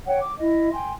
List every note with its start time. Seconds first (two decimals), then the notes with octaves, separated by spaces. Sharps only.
0.06 C#5 F#5 G5
0.20 D6
0.38 E4 D#5
0.73 G5 G#5 C6